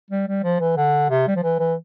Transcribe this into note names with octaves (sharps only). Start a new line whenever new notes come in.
G3
G3
F3
E3
D3
C3
G3
F3
E3
E3